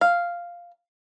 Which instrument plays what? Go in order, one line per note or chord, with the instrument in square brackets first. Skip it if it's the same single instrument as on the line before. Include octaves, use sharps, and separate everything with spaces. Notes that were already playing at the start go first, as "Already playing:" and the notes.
[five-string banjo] F5